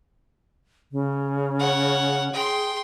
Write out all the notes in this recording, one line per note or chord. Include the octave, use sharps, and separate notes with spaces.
C#3
C#5 F#5
G#4 G5 C6